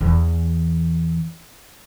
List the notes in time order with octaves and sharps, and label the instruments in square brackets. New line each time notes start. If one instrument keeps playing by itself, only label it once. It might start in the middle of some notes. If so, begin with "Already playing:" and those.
[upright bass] E2 E3